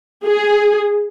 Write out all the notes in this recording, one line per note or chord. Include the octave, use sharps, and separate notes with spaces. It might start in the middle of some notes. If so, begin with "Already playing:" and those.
G#4